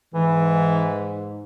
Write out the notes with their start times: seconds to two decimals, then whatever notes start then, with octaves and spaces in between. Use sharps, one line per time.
0.14 G#2 E3